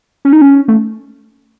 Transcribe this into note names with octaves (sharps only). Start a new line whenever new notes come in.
C#4
D#4
C#4
A3